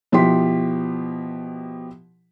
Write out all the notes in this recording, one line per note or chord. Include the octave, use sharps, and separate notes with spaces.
B2 F3 E4 G4 C6 B6